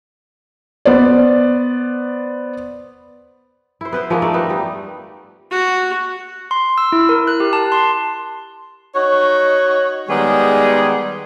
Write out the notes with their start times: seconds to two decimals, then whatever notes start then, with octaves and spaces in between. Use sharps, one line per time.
0.85 B3 C5 D5
3.81 E4 C5
3.93 B3 B4 C5
4.10 F3 G#3 A#3 D#4
4.22 A3 D#4 D5
4.34 G3 B3 D#4 A4
4.50 G3
5.51 F#4
6.51 C6
6.78 E6
6.92 E4
7.09 A#4
7.27 F#6
7.40 G4
7.53 A5
7.72 C6
8.95 D#4 F#4 C#5
10.08 D#3 G3 G#3 B3 G#4